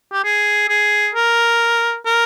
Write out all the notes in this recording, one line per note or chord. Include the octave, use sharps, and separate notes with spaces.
G4
G#4
G#4
A#4
A#4